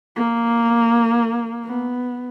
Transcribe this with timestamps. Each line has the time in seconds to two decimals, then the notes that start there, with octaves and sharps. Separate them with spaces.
0.16 A#3
1.65 B3